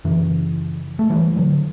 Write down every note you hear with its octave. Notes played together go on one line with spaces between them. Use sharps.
F#2 C#3 E3
A3
E3 G3
D3 F#3